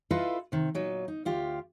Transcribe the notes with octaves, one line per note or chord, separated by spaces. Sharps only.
E4 F4 A4 B4 D#5 F5
C3 D#3
A#2 F#3 D#4
D#4
D2 F4 G4